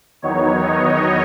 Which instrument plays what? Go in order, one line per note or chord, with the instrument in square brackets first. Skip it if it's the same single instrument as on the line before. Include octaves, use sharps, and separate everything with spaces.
[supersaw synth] E2 D#3 F#3 B3 D#4 C#5
D#5